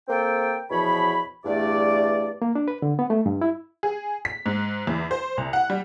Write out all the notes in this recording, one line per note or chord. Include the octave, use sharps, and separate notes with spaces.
A#3 C4 A4 G5
E2 B2 F3 C#5 B5
E2 G2 A3 D5
A#3
D4
B4
D3
B3
A3
G2
E4
G#4
B6
G#2
E2
C5
C2
F#5
G3